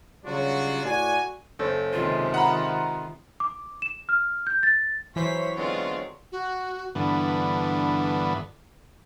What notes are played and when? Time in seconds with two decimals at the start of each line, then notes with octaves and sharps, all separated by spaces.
0.25 C#3 F#3 G3 D4 F4 F#4
0.84 A2 F#4 D5 G#5
1.59 F#1 A4 C5 C#5
1.93 C3 D#3 G#3 F4
2.34 F#5 A#5 B5
3.40 D6
3.82 E7
4.09 F6
4.47 G6
4.63 A6
5.16 E3 F#3 C5 C#5 B6
5.56 D3 G#3 B3 C4 F4
6.32 F#4
6.95 G2 D3 E3 B3